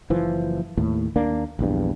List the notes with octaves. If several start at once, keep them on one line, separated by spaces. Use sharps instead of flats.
F#1 E3 F3
D#2 A2
D#2 A#3 D4
A#1 E2 G2